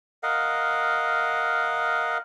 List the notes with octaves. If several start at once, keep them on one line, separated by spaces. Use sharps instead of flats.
A#4 D#5 F5 F#5